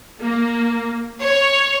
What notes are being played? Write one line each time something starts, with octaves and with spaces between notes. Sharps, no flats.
A#3
C#5